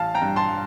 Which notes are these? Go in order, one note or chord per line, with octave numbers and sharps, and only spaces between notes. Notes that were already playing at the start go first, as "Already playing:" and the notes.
Already playing: A1 F5 A5
G5 A#5
G2
A5 C6